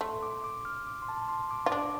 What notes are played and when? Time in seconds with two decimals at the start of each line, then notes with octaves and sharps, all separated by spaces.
0.01 A3 C6
0.23 D6
0.44 D6
0.65 F6
0.87 D6
1.02 C6
1.09 A5
1.22 A5
1.29 C6
1.51 D6
1.66 F4
1.72 D4 D6